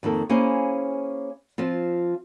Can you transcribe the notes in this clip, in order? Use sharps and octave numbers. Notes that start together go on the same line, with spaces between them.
F2 D#3 A#3 A4
A#3 C#4 E4 G#4 C5 F5
F3 C4 F4